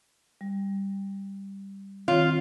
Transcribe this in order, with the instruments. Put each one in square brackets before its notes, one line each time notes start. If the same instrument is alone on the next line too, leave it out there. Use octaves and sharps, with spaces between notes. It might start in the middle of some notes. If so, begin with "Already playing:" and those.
[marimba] G3
[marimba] D#3 C4 C#5 [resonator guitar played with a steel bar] F4